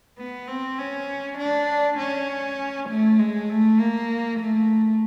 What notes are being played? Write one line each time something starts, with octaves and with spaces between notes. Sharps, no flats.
B3
C4
C#4
D4
C#4
A3
G#3
A3
A#3
A3